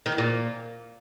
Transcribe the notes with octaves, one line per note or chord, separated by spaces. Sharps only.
D#3
E2
A#2